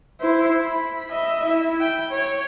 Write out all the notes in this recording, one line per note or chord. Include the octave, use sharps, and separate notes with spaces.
E4 C5
B5
D#5 E5
E4
G5
C#5